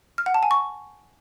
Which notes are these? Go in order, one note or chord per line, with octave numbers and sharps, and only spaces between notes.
F6
F#5
A5
G#5
C#6